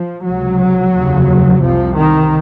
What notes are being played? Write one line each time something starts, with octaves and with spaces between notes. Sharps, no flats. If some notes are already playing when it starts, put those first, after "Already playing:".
Already playing: F3
C#2 C3 F#3
F1 D#2 C#3
C2 C3 F3
D#3